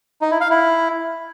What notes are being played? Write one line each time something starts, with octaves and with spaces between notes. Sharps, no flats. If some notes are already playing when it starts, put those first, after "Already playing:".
D#4
E4
F5
E4